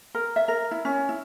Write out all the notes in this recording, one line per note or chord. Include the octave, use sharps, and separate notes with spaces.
A#4
E5
A#4
E4
C#4
E4